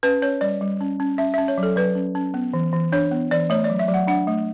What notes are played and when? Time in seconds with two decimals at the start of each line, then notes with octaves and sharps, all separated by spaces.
0.03 C#4 B4
0.22 C#4 C#5
0.41 G3 D5
0.61 G3
0.81 C#4
1.00 C#4
1.18 C#4 E5
1.34 C#4 E5
1.48 C#5
1.58 F#3
1.63 A4
1.76 F#3 B4
1.95 C#4
2.15 C#4
2.34 B3
2.53 E3
2.73 E3
2.92 D4 C#5
3.11 B3
3.31 E3 D5
3.50 A3 C#5
3.64 D5
3.70 F#3
3.79 E5
3.88 F#3
3.94 F#5
4.07 D4 F#5
4.27 A3